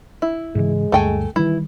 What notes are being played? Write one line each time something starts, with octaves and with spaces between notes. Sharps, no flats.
E4
G#2 C#3 E3 G#3
D2 G2 A3 G5 G#5
D#3 E3 G3 E4